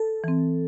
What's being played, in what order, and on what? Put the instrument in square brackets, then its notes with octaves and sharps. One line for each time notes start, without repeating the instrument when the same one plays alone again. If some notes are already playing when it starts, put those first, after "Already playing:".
Already playing: [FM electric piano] A4
[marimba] E3 C4